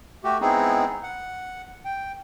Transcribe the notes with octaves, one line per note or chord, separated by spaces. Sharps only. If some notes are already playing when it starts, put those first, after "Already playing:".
A3 F#4 G4
G#3 B3 C4 D#4 E4 G#4
F#5
G5